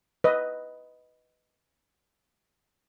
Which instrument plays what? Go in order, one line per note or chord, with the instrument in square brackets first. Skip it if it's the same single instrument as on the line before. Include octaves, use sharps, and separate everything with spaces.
[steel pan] B4 D#5